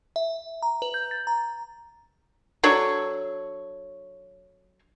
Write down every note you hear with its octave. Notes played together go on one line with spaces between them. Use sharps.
E5
A#5
B4
G6
A6
A#5
F#3 D4 A4 C#5